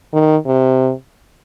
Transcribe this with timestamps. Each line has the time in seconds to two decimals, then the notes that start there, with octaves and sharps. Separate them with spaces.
0.13 D#3
0.46 C3